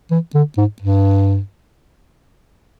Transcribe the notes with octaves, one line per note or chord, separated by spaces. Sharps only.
E3
D3
G#2
G2